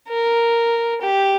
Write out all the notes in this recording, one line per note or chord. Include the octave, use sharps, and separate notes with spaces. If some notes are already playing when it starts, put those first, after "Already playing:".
A#4
G4